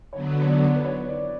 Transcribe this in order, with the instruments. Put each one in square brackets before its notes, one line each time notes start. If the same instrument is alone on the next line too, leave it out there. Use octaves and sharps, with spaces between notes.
[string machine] D3 F#3 B3 [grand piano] C#5
[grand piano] D5
B4
C#5
D5